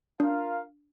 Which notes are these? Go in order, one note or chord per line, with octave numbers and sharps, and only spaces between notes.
D4 F4 A#4 F5